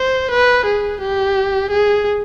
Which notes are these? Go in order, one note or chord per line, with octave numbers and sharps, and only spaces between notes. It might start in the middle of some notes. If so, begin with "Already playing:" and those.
Already playing: C5
B4
G#4
G4
G#4